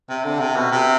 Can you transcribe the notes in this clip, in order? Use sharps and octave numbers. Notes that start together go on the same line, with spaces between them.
C3
D3
C3
B2
C3